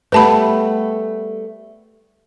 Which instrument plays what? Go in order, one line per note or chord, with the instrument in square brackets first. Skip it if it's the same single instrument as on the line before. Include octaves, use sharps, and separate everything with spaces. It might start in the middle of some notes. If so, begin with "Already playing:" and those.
[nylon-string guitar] G3 A3 B3 [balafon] B4 A5 B5